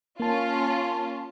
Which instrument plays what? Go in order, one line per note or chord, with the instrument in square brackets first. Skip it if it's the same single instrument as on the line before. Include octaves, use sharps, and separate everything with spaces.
[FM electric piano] A#3 A5 [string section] C#4 F4